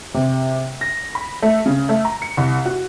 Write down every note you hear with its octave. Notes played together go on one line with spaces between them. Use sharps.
C3
A#6
B5
A3
C#3
A3
A#5
C#7
C2
F#4